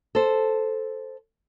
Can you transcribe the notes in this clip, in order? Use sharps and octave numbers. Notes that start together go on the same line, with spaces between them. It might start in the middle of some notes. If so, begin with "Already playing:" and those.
A4 C5